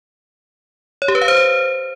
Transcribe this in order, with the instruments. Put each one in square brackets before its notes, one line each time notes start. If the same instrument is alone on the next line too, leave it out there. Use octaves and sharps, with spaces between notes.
[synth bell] C#5
G4
B4
F5
C5